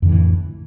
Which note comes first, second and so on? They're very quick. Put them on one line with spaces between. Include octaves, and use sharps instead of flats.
F2 D3 E3 A2